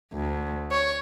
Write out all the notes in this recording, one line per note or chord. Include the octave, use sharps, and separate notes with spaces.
D2
C#5